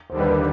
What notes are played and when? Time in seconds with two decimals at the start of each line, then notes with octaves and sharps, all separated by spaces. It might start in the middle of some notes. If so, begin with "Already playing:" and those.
0.10 D#2 D3 G3 C5
0.20 B4
0.30 A#4 C5